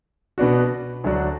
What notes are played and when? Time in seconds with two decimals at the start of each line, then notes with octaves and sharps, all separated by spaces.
0.38 B2 B3 D4 F#4
1.04 D2 D3 F#3 D4 F#4